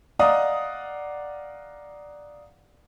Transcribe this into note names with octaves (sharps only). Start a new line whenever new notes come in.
D5 D#5 F5 F#5 A#5 D#6